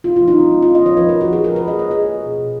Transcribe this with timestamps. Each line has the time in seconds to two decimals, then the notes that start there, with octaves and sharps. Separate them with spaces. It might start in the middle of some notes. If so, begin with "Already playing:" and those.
0.04 B3 F4
0.16 F4
0.20 F3
0.28 D#4
0.35 B3 C#4
0.51 G#3
0.62 F4
0.67 B3
0.75 D#5
0.82 F3 C#5
0.97 F3 B4
1.09 A#4
1.13 F3
1.21 F#4
1.28 F3 G#4
1.44 F3 A#4
1.56 B4
1.60 F3
1.68 D#5
1.75 A#3 C#5
1.90 A#3 G#4
2.07 C#4
2.22 B2
2.38 B2